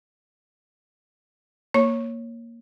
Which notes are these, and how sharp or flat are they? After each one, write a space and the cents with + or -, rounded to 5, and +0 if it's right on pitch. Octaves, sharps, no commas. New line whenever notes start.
A#3 +0 C#5 -10 C#6 -10